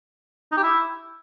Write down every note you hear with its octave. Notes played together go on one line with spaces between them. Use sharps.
D#4
G4
E4